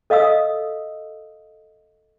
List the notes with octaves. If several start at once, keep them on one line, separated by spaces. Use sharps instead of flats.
A4 D#5 F5 D#6 E6